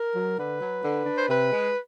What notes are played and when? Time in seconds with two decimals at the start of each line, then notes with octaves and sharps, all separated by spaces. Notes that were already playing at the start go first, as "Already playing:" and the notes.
Already playing: A#4
0.15 F#3
0.38 D3 B4
0.61 F#3
0.84 D3
1.06 D4
1.18 C5
1.29 C3 B4
1.53 G#3